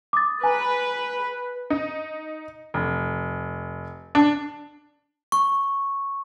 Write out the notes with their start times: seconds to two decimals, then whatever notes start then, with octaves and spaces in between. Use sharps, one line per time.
0.13 D6 D#6 A6
0.44 B4 G#5 A#5
1.70 D#4
2.74 F1
4.15 D4
5.32 C#6